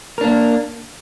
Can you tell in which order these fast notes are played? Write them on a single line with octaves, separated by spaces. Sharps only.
A#4 D4 A#3